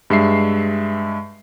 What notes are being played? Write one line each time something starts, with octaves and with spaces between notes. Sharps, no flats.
G2 G#3 E5 C7